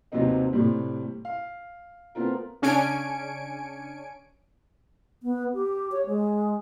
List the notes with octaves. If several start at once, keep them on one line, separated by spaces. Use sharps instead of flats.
D#2 C3 F#3 B3 C4 D#4
A2 C3 G3
F5
A3 B3 C4 F4 A#4
C#3 C#4 D4 G#5 C#7 D7
B3
G4
C#5
G#3